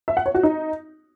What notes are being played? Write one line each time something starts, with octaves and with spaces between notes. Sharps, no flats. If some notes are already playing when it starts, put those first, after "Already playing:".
E5
F#5
C#5
F#4
D#4